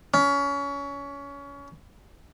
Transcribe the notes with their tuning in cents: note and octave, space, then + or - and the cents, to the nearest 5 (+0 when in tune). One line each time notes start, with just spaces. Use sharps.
C#4 +25